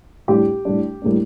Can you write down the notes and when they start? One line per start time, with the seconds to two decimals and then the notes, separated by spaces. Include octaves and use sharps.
0.28 A2 G3 D4 G4
0.65 A2 G3 D4
1.02 A2 G3 A#3 D4